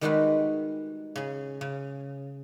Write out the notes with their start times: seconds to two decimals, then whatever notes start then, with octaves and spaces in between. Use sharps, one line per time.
0.01 D#3 G3 G#3 D#4 F#4 B4
1.16 C#3 G#4
1.61 C#3